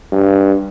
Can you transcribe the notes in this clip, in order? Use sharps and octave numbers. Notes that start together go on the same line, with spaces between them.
G2